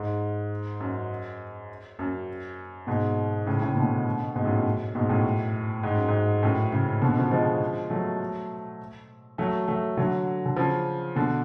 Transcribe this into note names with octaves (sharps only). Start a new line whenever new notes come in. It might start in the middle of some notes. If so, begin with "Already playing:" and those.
Already playing: G#2
F#2
F#2
G#2 B2
A2 C#3
A2 C#3
B2 D3
G#2 B2
F#2 A2
F#2
G#2 B2
F#2 A2
G#2
F#2
G#2
F#2 A2
A2 C#3
B2 D3
C#3 F3
F3 G#3
F#3 A3
F#3 A3
F#3 A3
D3 F#3
D3
C#3 F3
B2 D3